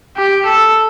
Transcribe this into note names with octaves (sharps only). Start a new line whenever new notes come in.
G4
A4